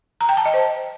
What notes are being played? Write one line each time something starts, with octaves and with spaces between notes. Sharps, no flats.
A#5
G5
A5
D#5
C5